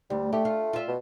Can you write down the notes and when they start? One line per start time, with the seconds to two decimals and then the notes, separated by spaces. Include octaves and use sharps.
0.10 D2 G3
0.33 A3 G4
0.45 F4
0.73 F4 E5
0.88 B2